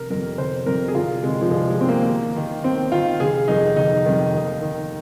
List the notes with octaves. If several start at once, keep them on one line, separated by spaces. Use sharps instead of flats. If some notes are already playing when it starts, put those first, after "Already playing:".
Already playing: F1 A#4
F2 C3 A#4
F1 C5
F2 C3 A#4
G#4
C2 F4
C3 D#3 G#3
F3
C2 G#3
G#3
C3 D#3 C4
A#3
D#2
D#3
D#2 C4
D#3 F4
F1 G#4
F2 D#3 D#4
F1 D#4
F2 D#3
D#2
D#3